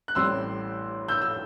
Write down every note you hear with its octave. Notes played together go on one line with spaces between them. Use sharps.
F#6
A1 A2 G3 C4 C6 E6
E6 G6
E6